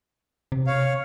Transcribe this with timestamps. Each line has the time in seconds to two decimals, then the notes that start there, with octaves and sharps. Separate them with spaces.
0.52 C3
0.67 C#5 F5